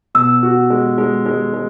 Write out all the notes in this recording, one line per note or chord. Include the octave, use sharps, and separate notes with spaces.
B2 E6
F#4
G#3
G#3
G#3
G#3